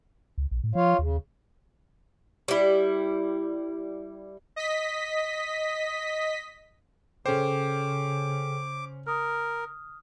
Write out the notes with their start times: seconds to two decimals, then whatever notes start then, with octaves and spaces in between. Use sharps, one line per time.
0.38 C#2
0.51 A#1
0.64 A2
0.75 F3 F4 C#5 F5
0.99 D#2 C#3
2.48 G3 E4
4.56 D#5 B6
7.26 C#3 C#4 G#4 A4 C5 G5 D6
9.07 A#4 D#6 F6